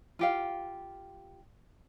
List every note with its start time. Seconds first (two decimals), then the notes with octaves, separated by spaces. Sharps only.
0.19 F4 G4 F5